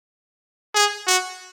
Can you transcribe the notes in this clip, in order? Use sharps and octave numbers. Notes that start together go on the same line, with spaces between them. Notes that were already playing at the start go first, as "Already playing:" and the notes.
G#4
F#4